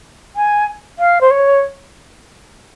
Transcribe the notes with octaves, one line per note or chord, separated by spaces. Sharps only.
G#5
F5
C5
C#5